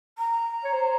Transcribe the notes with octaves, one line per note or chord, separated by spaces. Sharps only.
A#5
C#5
C5